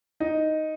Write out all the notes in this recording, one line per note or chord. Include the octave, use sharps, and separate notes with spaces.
D#4